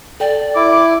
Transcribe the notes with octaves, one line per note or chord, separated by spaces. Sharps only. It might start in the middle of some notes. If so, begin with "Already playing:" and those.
A4 D5 G5
E4 D6